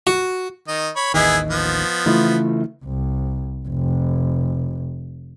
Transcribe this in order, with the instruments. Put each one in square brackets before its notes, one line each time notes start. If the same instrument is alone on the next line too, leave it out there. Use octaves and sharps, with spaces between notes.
[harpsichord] F#4
[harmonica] D#3 D#5
C#5 B5
[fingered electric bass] A1 D#2 D#3 [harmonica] B3 E4 G#4 [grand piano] D#5
[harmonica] F3 B3
[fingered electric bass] C#3 E3 [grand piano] A3 E4 F4
[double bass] C2
F1